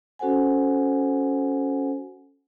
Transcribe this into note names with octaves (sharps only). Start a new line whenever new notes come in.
C#4 F#4 A4 C5 F#5 G#5